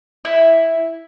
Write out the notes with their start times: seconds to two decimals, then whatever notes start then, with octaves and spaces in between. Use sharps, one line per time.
0.25 E4